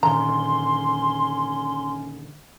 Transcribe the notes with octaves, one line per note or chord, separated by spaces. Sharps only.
A#2 D3 D#3 C#4 A#5 C6